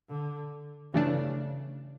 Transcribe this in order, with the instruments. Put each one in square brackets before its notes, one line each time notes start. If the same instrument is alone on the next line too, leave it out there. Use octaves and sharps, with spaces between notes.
[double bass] D3
[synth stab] G2 E3 A3 D4 [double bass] C#3